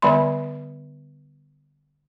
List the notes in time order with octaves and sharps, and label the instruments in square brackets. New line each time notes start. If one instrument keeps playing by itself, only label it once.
[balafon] D3 G3 B3 D5 B5 C6